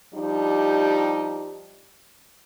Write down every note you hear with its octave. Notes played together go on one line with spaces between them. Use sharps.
F3 G3 D4 D#4 G4